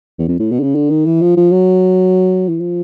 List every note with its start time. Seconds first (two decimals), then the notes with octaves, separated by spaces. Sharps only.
0.19 E2
0.29 F2
0.40 A2
0.52 B2
0.60 D3
0.63 C#3
0.75 D3
0.90 D#3
1.06 E3
1.21 F3
1.37 F3
1.52 F#3
2.49 E3
2.60 F3